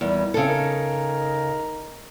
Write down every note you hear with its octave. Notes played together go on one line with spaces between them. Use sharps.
E2 A#2 D#3 G3
C#3 E3 F3 C4 A4
D#4 A#4